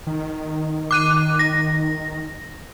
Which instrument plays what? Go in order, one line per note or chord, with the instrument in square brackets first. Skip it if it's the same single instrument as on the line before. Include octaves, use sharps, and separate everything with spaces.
[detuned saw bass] D#3
[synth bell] D6 F#6 D#7
A#6